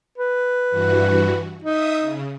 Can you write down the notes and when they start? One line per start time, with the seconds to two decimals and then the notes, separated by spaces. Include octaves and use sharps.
0.18 B4
0.70 G2 E3 F#4
1.64 D#4 E5 D#6
2.00 C#3